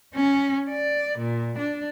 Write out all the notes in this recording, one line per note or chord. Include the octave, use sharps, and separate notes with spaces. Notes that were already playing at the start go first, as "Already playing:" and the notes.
C#4
D5
A#2
D4